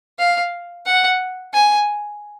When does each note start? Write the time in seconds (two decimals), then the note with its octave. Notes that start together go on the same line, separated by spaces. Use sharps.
0.19 F5
0.86 F#5
1.54 G#5